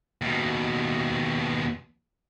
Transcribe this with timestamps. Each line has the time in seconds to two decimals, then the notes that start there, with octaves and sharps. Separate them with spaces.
0.22 D#2 B2